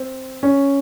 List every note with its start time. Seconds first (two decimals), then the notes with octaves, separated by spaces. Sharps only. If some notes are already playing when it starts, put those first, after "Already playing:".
Already playing: C4
0.43 C#4